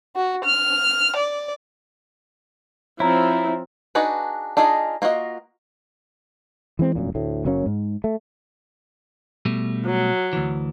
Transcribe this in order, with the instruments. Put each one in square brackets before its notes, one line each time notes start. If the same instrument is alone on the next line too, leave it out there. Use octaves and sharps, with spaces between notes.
[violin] F#4
F6
D5
[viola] F3 C4 [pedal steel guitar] E4 [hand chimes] C#5 A#5
[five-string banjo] D4 D#4 F#4 G#4 B4
D4 D#4 F4 G#4 D#5
A#3 F4 F#4 D#5
[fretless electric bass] E3 G#3 C4
F1 F#2 A#2
D2 A2
F#1 F#3 A#3 C#4
G#2
A3
[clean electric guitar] B2 G3 A3
[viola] F#3
[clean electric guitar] D2 E3